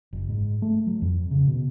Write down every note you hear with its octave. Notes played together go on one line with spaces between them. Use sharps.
F#1
G#2
A3
F#3
F2
C#3
B2